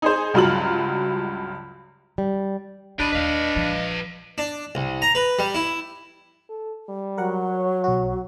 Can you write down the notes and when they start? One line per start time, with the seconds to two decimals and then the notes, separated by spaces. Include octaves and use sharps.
0.02 D#4 G#4 C5
0.34 C#2 G2 F#3 F4 F#7
2.18 G3
2.99 D1 C#4 D4 G4 D#5 B5
3.12 D#2 G#3 B4 D#5 F5
3.55 A#1 F3
4.38 D4
4.75 C2
5.02 A#5
5.15 B4
5.39 G3
5.55 E4
6.49 A4
6.89 G3
7.18 F#3 A#4 F#5
7.49 C#5
7.84 B1 F#4